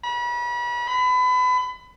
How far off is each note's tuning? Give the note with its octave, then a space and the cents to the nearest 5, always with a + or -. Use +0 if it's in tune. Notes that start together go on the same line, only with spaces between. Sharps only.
B5 -35
B5 +30